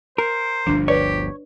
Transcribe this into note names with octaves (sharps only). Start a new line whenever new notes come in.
A#4 C5
G1 D2 F3 D4
G4 B4 C#5 D5